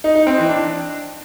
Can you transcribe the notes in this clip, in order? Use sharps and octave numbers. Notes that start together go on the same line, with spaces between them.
D#4
D#4
C4
E3
D4